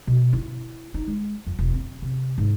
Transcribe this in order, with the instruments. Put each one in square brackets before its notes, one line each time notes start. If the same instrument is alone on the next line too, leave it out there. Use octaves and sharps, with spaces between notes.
[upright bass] B2
E4
D#4
G#3
F2
E1
C4
C3
G#2